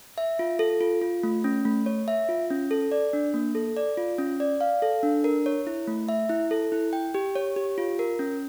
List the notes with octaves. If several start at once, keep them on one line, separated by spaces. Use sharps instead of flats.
E5
F4
A4
F4
F4
A3
C#4
A3
C#5
E5
F4
C#4
A4
D5
D4
A#3
A4
D5
F4
C#4
D5
F5
A4
D4
A#4
C#5
E4
A3
E5
E4
A4
E4
G5
G4
C#5
G4
F4
A#4
C#4